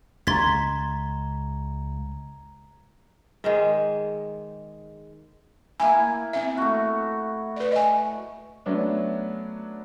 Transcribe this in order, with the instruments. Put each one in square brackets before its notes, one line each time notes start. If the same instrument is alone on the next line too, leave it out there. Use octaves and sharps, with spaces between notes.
[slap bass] C#2 [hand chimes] A#5 G#6 [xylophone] C6 A6 B6
[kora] G#2 D#3 G#3
[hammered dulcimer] A#3 E4 [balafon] G#5
[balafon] C4 E5
[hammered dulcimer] A3 F#4
[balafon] B4 D5
D#5 G#5
[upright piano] F#3 A3 B3 C#4 D4